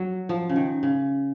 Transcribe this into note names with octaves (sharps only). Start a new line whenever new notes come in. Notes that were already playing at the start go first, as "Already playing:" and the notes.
Already playing: F#3
F3
C#3
D#3
C#3